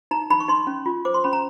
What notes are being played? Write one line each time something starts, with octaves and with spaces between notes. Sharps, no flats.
D#4 A#5
D#4 B5
C#6
D#4 C6
C#4
F4
C5 D6
C6
C#4 B5
A#5